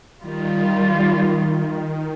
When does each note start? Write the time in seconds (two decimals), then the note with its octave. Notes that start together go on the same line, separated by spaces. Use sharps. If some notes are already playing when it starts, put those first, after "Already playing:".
0.21 D#3 G3 F4